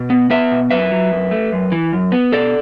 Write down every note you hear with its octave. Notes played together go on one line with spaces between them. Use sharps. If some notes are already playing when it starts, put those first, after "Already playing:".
Already playing: B2
B3
B3 B4 E5
B2
F#2 B4 E5
F#3
F#2
A3
F#2
E3
F#2
B3
B2 A4 D5